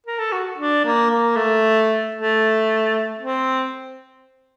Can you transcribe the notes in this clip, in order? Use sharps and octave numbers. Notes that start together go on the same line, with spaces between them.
A#4
A4
F#4
D4
A#3
A#3
A3
A3
C4